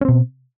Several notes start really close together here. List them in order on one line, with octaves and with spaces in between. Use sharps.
C#4 C4 B2